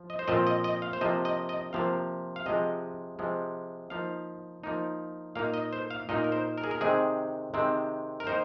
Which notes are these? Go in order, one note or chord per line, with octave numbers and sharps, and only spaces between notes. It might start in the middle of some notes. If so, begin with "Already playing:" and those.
Already playing: F3
D#5
C5
A#2 F3 C4 D#5
D#5
D#5
F5
C5
C3 F3 A#3 D#5
D#5
D#5
C3 F3 A#3 F5
F5
C3 F3 G#3 D#5
C3 F3 G#3
F3 A#3 D#4 F5
F3 A#3 D#4
A#2 A#3 D#4 F5
D#5
C5
F5
A#2 A#3 D#4 D#5
A#4
C5
A#4
G#4
A#4
C3 D#3 G#3 C4 G#4
C3 D#3 G#3 C4
A#4
D#3 A#3 D#4 C5